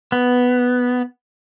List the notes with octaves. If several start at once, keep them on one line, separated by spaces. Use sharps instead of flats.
B3